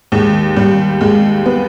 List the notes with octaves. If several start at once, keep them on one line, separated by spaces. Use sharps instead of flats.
D#2 G#3
D#2 G3
D#2 G#3
B3